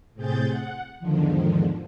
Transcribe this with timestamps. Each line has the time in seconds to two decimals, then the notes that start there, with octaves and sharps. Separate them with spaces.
0.14 A2 C3 C4 G#4 G6 A6
0.48 F#5
0.99 E2 G#2 D3 D#3 F3